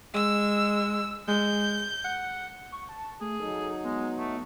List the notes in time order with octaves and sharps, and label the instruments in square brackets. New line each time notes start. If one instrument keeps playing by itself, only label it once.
[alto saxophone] G#3 [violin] E6
[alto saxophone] G#3 [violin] G6
[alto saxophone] F#5
[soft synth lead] C#6
A5
[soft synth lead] A3 [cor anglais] G#4
[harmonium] F#3 D#4 [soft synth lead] A4
[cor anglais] G#3 [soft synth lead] B3
[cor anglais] A3